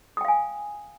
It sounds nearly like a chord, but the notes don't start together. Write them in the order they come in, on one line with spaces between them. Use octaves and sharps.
D#6 G5 F5 G#5